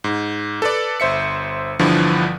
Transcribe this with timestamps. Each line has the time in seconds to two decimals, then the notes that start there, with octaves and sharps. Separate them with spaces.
0.04 G#2
0.62 A4 B4 D5
1.00 G1 C5 E5 C#7
1.79 G1 G2 D3 E3 F3